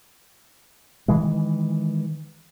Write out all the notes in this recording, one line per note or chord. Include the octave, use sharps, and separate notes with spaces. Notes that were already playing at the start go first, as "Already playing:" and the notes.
D#3 E3 G#3